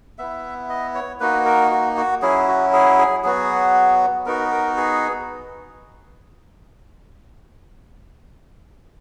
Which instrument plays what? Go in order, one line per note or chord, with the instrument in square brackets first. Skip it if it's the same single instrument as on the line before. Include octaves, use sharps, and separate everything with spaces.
[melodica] B3 E4 E5
D#5
C#5
A#3 D#4 F#4 B4
A#4
F#4
F#4
F#3 C#4 E4 G#4
F#4
G#4
G#4
F#3 B3 F#4 G#4
B3 D#4 F#4 A#4
A#4
G#4